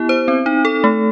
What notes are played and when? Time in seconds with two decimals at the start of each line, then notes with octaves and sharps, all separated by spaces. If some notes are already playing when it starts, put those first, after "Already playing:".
Already playing: B3 E4 G4
0.09 C5
0.28 C4
0.46 D#4
0.65 A4
0.84 A3